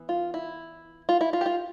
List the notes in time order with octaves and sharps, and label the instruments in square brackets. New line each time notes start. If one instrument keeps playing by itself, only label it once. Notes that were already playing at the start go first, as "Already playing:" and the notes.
Already playing: [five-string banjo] E3 B3
F4
E4
F4
E4
F4
G4
F4